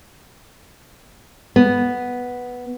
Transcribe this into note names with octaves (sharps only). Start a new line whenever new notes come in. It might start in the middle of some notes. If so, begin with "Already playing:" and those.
B3